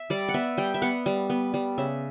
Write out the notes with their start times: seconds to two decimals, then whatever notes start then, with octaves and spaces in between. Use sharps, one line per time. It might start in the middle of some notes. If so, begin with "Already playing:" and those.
Already playing: E5
0.10 G3 D5
0.28 F#5
0.34 B3 E5
0.57 G3 G5
0.74 E5
0.82 B3 F#5
1.06 G3
1.30 B3
1.54 G3
1.78 C#3 E5